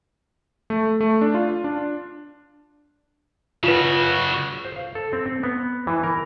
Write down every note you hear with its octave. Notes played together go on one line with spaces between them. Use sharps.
A3
A3
D4
F4
D4
C#3 F4 F#4 B4
C5
F5
A4
C4
C4
B3
E3
A#4